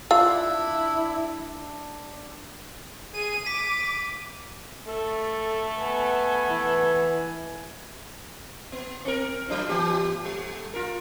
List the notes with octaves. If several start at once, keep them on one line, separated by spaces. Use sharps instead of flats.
D4 E4 F4 F5 E6
G#4 D#7
D6 B6
A3 A4
B3 G#5
E3
B3
C4 A#4
F#3 D4 F4
E3 B3 G4
G3
F4 A#4